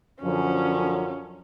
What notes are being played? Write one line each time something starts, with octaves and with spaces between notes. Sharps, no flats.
F#2 D3 F3 C#4